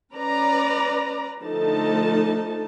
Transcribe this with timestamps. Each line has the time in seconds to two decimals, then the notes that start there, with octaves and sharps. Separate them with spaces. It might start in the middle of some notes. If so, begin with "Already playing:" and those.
0.14 C#4 B4 D5 A#5
1.45 D3 F3 A3 D#4 A5